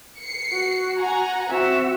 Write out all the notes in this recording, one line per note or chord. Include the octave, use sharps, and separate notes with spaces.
C7 C#7
F#4
F#5 G#5 A#5
C4 F#4 E5